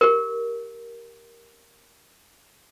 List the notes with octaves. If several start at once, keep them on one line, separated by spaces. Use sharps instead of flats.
G4 A#4